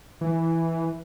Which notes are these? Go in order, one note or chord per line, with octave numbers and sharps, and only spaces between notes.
E3